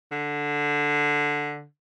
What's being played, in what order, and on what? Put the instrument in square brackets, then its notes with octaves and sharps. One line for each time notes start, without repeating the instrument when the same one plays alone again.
[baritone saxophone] D3